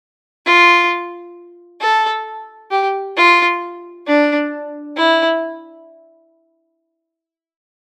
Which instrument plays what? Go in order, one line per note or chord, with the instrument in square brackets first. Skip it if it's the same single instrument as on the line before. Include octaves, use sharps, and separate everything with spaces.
[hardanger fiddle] F4
A4
G4
F4
D4
E4